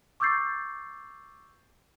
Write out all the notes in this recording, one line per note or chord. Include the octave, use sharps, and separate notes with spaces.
C#6 D6 E6 G6 A6 C7